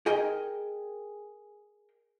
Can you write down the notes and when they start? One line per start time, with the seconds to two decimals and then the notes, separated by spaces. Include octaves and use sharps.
0.06 G#4 A#4 D#5 G5